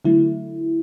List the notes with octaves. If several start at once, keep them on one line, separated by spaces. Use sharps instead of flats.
D3 F#3 A3 E4